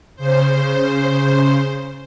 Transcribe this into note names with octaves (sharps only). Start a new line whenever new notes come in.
C#3 C5